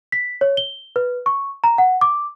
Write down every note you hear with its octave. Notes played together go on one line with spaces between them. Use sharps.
B6
C#5
G7
B4
C#6
A#5
F#5
D6